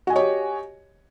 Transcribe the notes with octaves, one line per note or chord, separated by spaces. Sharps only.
F#4 G4 C#5 D#5 G#5